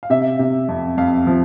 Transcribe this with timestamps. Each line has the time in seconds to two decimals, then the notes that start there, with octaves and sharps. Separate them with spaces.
0.03 F5
0.10 C3 E5
0.39 C3
0.68 F2
0.97 F2 F5
1.27 F3